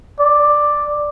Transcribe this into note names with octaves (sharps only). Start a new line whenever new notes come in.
D5